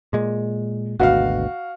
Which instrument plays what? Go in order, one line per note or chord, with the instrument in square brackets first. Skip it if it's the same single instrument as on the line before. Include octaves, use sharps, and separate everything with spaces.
[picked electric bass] A#2 G#3
[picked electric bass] G#1 D2 B2 [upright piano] F#4 F5